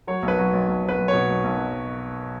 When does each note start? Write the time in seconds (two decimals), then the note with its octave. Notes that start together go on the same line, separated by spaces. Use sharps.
0.07 F#3 C#5
0.23 B1
0.28 B4
0.38 F#3
0.53 B1
0.68 B1
0.83 F#3
0.89 B4
0.98 B1
1.08 B2 C#5
1.28 B1
1.44 B1
1.58 F#3